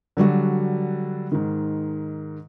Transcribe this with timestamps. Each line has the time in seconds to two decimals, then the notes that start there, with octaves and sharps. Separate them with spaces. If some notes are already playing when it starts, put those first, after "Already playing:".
0.17 D3 F#3 G3 F#4
1.32 G#2 D#3